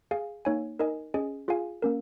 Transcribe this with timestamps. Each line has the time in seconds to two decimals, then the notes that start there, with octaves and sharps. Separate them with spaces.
0.11 G#4 F5 G#5
0.45 A#3 D#4 C#5 G#5
0.79 D#4 A#4 D#5 G#5
1.14 C#4 G#4 D#5 G#5
1.48 F4 G#4 F5 G#5
1.82 A#3 C#4 A#4